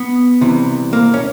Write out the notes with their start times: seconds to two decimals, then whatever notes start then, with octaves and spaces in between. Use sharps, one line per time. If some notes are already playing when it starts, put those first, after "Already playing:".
Already playing: B3
0.41 C2 C3 E3
0.93 A#3
1.14 C#4